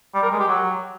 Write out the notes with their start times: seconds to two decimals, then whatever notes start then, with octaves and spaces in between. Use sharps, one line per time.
0.14 G3
0.23 A#4
0.31 G#3
0.39 G4
0.48 F#3